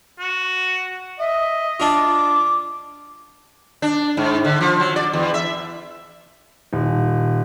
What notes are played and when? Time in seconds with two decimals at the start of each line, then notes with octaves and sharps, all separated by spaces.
0.19 F#4
1.19 D#5 E5
1.80 D4 F4 D6
3.82 D4
4.17 G#2
4.45 D3
4.61 F3
4.80 F#3
4.96 D5
5.13 E2
5.34 E5
6.73 D#1